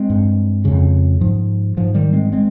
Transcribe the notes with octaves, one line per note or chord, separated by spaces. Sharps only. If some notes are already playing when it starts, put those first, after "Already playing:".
Already playing: G#3 C4
G2
F2 C#3
G#2 F3
G#2 F3
D#3 G3
G#3 C4
G#3 C4